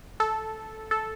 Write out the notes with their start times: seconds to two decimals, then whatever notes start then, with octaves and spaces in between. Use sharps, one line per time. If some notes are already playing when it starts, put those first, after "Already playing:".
0.20 A4
0.91 A4